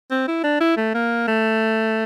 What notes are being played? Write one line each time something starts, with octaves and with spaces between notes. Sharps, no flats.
C4
E4
D4
E4
A3
A#3
A3